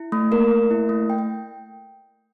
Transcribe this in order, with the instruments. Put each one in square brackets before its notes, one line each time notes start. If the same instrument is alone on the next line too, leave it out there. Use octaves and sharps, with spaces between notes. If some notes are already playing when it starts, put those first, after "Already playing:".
Already playing: [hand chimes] E4
A3
[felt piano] A#3 [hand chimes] A#4
[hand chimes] A3
E4
A3
G5